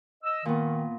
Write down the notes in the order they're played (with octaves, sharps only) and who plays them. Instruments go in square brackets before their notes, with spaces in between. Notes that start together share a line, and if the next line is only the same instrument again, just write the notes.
[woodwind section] D#5 E6
[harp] A#2 B3 [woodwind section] D#3